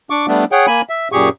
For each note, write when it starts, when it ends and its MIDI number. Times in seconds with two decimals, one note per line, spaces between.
0.10 0.26 62
0.10 0.26 85
0.10 0.26 86
0.28 0.45 55
0.28 0.45 57
0.28 0.45 59
0.28 0.45 62
0.52 0.66 68
0.52 0.66 73
0.52 0.66 78
0.52 0.66 79
0.67 0.81 58
0.67 0.81 80
0.67 0.81 83
0.89 1.08 76
1.12 1.29 42
1.12 1.29 46
1.12 1.29 67
1.12 1.29 68
1.12 1.29 85